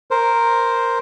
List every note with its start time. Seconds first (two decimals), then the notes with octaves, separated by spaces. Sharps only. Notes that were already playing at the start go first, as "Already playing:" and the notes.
0.11 A#4 C5